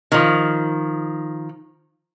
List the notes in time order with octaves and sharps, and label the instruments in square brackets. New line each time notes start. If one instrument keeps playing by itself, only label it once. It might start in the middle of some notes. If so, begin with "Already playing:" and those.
[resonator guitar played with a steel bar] D#3 F3